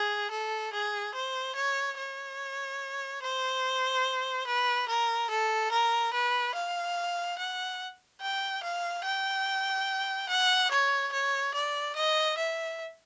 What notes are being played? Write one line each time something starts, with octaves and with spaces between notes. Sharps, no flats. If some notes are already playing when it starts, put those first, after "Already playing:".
Already playing: G#4
A4
G#4
C5
C#5
C#5
C5
B4
A#4
A4
A#4
B4
F5
F#5
G5
F5
G5
F#5
C#5
C#5
D5
D#5
E5